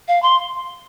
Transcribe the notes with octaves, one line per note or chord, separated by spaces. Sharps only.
F5
C6